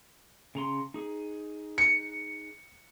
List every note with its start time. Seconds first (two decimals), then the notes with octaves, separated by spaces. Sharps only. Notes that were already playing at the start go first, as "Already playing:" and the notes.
0.55 C#3 A#5 C6
0.94 D#4 G#4
1.78 C#7